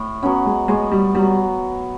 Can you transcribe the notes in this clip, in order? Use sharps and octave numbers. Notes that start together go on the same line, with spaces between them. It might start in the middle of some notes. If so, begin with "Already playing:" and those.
Already playing: A2
F#3 B3 C#4
G#3
A2 G#3
G3
F#3 G3 B3